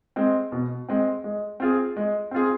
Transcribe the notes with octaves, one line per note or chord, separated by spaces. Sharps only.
G#3 C4
B2
G#3 C4
G#3
C4 F4 G#4
G#3
C4 F4 G#4